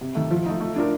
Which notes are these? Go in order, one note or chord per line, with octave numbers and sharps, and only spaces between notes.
C3
D#3 A3
F3
A3 D#4
A3
D4 F4 A#4